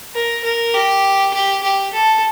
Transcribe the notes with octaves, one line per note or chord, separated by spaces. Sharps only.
A#4
A#4
G4
G4
G4
A4